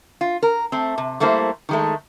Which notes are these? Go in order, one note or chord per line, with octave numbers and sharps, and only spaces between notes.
F4
A#4
A3 C4
C3
G3 A3 A#3 E4 C5
D#3 G#3 A3